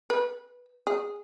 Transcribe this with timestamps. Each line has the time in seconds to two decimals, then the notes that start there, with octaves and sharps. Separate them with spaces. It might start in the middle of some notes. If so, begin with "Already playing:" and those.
0.10 B4
0.87 G#4